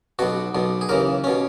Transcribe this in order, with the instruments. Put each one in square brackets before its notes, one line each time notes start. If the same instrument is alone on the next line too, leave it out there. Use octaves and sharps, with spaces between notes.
[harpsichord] B1 B2 F#4
B1 B2
G#4
D#2 C#3 E3 A#4
B2 C#4